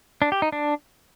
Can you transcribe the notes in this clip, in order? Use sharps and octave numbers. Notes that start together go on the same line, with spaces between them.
D4
G4
D#4
D4